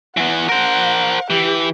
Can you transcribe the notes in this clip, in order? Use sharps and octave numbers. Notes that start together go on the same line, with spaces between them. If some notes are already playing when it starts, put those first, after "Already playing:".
E3 B3 F#5
A#4 C5
E3 G4